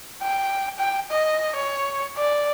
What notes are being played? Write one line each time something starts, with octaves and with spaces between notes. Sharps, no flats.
G5
G5
D#5
C#5
D5